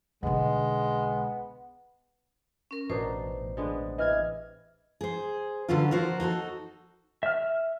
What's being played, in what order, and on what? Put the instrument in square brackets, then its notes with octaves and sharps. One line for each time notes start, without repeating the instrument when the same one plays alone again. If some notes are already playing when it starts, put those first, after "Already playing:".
[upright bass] B1 D3 [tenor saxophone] G#3 [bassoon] B3
[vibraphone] C#4 A#4
[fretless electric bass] A1 [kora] B2 D4 D#4 [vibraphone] C5
[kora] D3 G#3 B3
[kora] C3 E3 [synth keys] D#5 F6 G#6
[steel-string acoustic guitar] G#4 C5
D3 F#3 B3 C#4 F4
F3 A#3 F#4 C5
D#4 F#4 G#4 A4
[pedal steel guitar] E5 F6